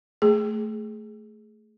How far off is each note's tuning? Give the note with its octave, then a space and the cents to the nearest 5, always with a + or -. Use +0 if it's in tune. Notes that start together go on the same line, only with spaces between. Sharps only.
A3 +0 G#4 +10